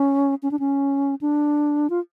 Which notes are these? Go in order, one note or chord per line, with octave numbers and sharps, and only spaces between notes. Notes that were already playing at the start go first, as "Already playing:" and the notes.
Already playing: C#4
C#4
D4
C#4
D4
F4